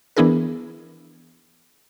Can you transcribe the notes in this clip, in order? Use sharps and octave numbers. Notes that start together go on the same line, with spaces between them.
E3 B3 D4 E4 G#4 A#4